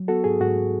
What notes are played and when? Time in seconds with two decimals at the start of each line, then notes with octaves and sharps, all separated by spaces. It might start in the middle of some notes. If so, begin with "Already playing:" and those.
Already playing: F#3
0.08 B3 F#4 A4
0.24 G#2 G#4
0.41 G#2 F#4